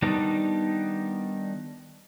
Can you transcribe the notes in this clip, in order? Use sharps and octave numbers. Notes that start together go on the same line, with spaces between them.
D#3 G3 B3 D4 D#4